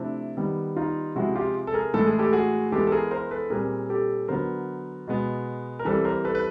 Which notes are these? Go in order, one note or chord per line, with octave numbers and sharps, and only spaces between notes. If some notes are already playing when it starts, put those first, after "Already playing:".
Already playing: C3 F3 A3 C4 D4 E4
D#3 G3 B3
D#4 F4
C3 F3 G#3 C4 E4 F#4
F4 G4
A4
G#4 A#4
A2 E3 G#3 A4
G#4
G4 A4
F#4 G#4
E3 G#3 B3 G4 A4
A4
G#4 A#4
A#4 C5
A4 B4
A#2 G3 C4 G#4 A#4
G4 A4
D3 F#3 B3 A#4 C5
B2 G#3 B3
A#4
E3 G3 C4 A4 B4
A#4 C5
A4 B4
B4